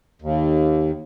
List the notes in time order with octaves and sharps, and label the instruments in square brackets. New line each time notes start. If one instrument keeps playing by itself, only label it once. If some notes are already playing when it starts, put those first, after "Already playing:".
[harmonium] D#2